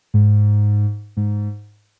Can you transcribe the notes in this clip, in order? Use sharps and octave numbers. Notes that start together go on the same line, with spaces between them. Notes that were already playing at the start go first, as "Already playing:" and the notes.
G#2
G#2